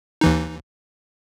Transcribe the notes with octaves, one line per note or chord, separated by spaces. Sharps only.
D#2 E3 D#4